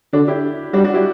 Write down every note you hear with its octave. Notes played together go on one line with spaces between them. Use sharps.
D3 D4 F#4
E4 G4
G3 D4 F#4
D4 F#4
E4 G4